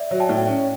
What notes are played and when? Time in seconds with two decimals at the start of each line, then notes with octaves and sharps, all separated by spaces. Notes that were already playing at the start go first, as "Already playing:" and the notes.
Already playing: D5 E5
0.11 F#3
0.20 G5 A5
0.29 A2
0.47 C#4